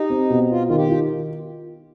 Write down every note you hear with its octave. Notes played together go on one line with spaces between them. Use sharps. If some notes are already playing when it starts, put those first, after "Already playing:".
Already playing: D#4 G4
C4
B2
B3 F4
D#3 F4
G4
F4